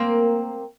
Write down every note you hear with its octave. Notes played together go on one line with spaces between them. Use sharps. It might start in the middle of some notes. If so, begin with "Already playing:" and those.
Already playing: A#3 C4